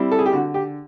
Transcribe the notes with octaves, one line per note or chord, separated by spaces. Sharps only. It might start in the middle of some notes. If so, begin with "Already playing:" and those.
Already playing: G3 C4 E4
A4
G#4
G4
D3 F#4
G4